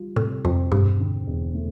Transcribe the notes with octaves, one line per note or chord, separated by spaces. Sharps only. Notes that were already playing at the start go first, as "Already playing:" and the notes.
Already playing: G3 F4
A2 C3
F2 C4
E1 G2
D3
E2
A3